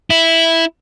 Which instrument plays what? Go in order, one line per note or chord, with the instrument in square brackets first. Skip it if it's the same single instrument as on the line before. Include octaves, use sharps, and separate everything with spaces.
[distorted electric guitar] E4